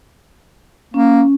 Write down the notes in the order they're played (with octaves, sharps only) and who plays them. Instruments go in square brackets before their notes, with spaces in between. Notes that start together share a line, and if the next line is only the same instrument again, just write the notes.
[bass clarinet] A#3 [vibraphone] C#4